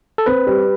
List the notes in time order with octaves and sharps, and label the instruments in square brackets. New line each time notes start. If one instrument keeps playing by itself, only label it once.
[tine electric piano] A4
[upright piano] C4 [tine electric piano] B4
[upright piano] G3